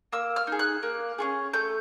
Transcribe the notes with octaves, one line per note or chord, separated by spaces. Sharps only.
A#3 E6
F6
D#4 G#4
F#6
A#3
C#4 F4 G#4
A3 G6